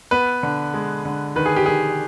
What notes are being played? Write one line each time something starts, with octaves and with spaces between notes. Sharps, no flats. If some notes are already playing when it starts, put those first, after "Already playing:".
B3 B4
D3
G#3
D3
D#3 B4
G#4
G4
D#3 G#4